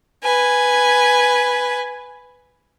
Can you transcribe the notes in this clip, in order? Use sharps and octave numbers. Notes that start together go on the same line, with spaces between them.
B4 G#5